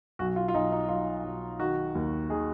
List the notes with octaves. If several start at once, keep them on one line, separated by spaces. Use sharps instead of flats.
B1 F#4
F4
F4
B1 D#4
D#4
F#3 F4
B1
D#3 F#4
D#2
D#3 G#4